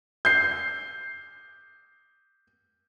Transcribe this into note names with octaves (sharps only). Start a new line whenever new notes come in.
G6 C7